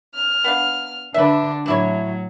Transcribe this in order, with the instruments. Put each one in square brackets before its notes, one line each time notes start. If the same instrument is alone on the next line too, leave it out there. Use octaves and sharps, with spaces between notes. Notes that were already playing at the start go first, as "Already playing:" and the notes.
[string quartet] F6
[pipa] B3 D4 F5
[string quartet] D3 D4 [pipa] B4 E5
[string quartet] A2 F#3 [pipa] D4 E4 C#5